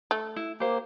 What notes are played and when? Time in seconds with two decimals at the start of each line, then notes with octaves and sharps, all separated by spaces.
0.11 A3
0.36 E4
0.60 A#3 G4 C5